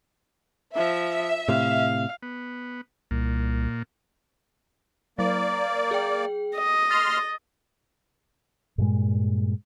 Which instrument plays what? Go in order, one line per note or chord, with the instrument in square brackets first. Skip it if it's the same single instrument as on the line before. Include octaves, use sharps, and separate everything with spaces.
[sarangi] F3 [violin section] E5
[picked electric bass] A2 C3 [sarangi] F5
[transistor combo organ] B3
[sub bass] C2 [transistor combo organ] A#2
[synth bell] F#3 [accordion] A#3 D5
[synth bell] G#4 G5
[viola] D#5
[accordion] C6 F6 [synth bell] A6
[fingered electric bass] G2 A#2 G#3